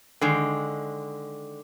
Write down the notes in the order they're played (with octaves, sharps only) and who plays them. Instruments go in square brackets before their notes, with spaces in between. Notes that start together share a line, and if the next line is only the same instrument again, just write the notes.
[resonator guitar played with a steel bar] D3 D#3 G#3